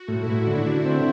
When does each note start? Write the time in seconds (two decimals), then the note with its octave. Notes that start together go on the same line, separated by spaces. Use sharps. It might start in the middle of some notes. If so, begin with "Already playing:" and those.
Already playing: F#4
0.08 A2
0.18 E4
0.27 A2
0.47 D3 D4
0.66 D3
0.86 C4